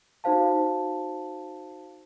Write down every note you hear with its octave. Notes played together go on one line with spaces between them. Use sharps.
D#4 F#4 C5 F5 A5